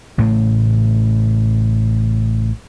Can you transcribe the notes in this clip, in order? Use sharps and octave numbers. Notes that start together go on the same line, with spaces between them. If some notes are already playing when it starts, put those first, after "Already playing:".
A1 A2 C#3 A3